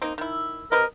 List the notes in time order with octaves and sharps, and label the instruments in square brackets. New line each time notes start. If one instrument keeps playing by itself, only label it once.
[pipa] A#3 C4 D#4
D#3 E4
[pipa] C3 B4 D#5 [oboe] A#4